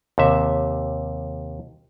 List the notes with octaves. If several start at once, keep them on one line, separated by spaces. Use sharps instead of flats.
D#2 C3 E5